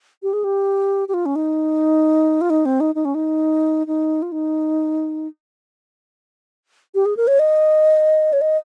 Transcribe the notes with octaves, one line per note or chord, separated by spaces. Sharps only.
G4
G#4
G4
G4
F4
C#4
D#4
F4
D#4
C4
D#4
D#4
C#4
D#4
D#4
F4
D#4
G4
G#4
A#4
C#5
D#5
C#5
D#5